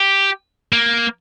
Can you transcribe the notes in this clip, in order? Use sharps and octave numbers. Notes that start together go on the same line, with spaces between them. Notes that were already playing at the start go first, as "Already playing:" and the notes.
Already playing: G4
A#3